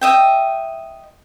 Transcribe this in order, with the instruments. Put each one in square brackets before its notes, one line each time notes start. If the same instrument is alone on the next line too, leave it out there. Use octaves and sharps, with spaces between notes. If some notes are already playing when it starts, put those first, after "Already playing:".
[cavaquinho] D#5 E5 G5